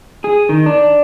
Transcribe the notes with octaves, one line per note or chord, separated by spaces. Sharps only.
G#4
D#3
D4